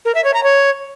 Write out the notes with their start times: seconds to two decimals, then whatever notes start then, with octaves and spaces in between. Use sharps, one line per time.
0.05 A#4
0.15 E5
0.24 C#5
0.34 A#5
0.43 C#5